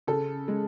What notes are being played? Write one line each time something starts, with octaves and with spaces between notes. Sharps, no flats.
C#3 A4
G#3